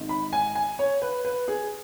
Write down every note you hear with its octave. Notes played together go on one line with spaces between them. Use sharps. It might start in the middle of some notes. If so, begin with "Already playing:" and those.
Already playing: G#1 G#2 D#3
B5
G#5
G#5
C#5
B4
B4
G#4